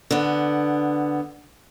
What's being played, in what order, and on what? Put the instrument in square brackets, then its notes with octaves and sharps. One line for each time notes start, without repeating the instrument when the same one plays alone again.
[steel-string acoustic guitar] D3 B3